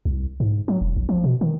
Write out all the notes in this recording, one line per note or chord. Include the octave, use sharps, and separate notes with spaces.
C2
G#2
F#3
E1
A#1
F3
B2
D#3